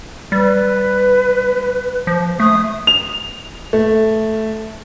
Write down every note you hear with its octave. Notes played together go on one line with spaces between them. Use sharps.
G3 B4
F3
A3 D#6
F7
A3